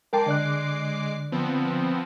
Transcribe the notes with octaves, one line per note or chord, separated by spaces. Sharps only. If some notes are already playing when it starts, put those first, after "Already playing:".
G#3 A#4 G5 A5 D6 C7
D3 D5 F#6
F3 B3 C4